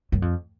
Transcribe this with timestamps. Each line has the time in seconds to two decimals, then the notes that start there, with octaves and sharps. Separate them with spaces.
0.12 F#2
0.22 F2